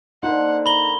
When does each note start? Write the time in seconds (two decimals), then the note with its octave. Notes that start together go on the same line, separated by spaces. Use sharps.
0.23 D3 A#3 D#4 C5 F#5
0.66 A#5 B5 G7